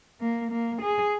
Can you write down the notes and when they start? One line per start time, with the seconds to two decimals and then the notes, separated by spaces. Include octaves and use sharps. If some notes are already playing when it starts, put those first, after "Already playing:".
0.21 A#3
0.51 A#3
0.82 G#4